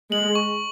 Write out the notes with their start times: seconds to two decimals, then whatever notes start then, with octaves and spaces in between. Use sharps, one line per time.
0.11 G#3 F#7
0.35 C#6